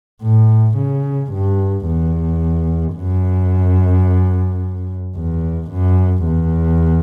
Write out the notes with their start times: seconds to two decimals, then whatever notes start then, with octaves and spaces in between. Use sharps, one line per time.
0.22 A2
0.77 C#3
1.32 G2
1.87 E2
2.96 F#2
5.16 E2
5.71 F#2
6.25 E2